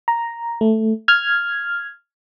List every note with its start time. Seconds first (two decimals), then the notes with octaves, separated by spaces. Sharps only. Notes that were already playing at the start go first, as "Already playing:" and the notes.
0.08 A#5
0.61 A3
1.08 F6 G#6